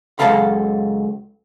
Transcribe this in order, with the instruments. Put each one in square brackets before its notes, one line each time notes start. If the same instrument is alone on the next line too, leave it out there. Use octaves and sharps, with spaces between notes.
[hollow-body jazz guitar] C#2 F#2 F#3 A4 F5 B5